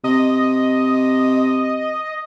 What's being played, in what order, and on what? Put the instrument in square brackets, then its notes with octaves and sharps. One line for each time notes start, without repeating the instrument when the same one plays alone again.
[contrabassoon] C3 [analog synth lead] D#5